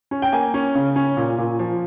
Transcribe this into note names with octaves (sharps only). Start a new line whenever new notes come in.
C#4
G5
A#3 G#5
C#4
C#3
C#4
A#2
A#2
F3